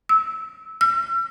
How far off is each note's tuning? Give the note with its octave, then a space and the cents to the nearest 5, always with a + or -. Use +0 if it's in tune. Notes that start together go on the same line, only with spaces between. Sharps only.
E6 -15
E6 +45